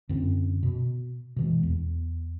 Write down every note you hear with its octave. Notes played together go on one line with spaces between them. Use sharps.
F#2 D3 C4
B2
B2 E3 G#3
E2